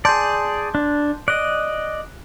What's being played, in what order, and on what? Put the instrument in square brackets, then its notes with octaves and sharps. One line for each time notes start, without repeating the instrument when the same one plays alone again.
[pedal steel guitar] G#4 D5 [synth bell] A5 C6 G6
[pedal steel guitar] D4
[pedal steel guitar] D5 D#5 [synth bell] F#6